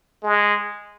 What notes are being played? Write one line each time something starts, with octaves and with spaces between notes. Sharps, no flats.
G#3